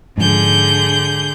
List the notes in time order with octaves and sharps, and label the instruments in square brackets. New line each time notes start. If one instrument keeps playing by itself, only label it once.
[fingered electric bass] G#2 F3 [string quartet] D3 G#4 G6